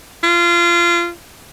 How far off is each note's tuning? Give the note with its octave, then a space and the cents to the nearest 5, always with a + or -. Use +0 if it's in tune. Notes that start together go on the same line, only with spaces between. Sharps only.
F4 -25